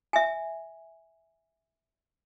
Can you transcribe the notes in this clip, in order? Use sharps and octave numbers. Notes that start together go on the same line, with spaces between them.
E5 G#5